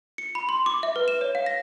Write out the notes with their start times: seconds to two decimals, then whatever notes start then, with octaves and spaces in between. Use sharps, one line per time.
0.18 C#7
0.35 B5
0.49 C6
0.66 D6
0.83 E5
0.96 B4
1.08 E7
1.21 C#5
1.35 F5
1.46 A#6